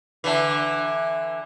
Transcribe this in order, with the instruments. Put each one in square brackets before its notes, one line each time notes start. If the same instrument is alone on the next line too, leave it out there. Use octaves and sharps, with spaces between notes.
[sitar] D3 E3